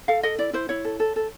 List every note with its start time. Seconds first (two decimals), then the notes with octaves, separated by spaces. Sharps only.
0.08 A4 F5
0.23 A4 D#5
0.38 E4 D5
0.53 E4 C5
0.69 E4 C#5
0.85 A4
1.00 A4
1.16 A4